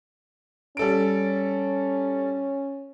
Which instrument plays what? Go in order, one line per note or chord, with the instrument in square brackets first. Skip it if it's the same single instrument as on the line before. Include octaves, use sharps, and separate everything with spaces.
[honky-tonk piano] G3 A4 D7 [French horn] C#4